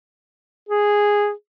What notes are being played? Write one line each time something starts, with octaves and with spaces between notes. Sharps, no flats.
G#4